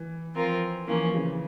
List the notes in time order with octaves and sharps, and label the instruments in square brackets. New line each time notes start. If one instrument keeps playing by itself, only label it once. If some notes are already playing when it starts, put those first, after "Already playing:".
Already playing: [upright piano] E3
[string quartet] F3 C4 F4 A#4
[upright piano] E3 [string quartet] F3 A#3 C#4
[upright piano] C#3